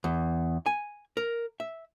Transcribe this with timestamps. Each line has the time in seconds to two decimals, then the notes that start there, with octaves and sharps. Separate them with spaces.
0.04 E2
0.66 G#5
1.17 A#4
1.60 E5